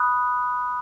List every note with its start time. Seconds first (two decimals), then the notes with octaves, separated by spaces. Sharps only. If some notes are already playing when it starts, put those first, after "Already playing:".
Already playing: B5 D#6 F#6